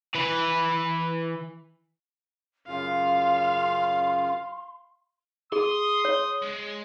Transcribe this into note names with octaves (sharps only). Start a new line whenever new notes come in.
E3 B4
F#2 C#3 F4 F5 C6
G#4 C6 D#6
C#5
G#3